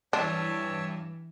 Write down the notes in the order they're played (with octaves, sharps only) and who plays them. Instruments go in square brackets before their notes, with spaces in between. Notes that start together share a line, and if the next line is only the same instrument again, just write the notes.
[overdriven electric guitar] G2 [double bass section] E3 [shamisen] D4 [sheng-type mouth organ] C#5 E5 A5